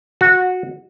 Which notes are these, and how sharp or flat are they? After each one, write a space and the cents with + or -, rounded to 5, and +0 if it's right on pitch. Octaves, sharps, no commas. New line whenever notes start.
F#4 -15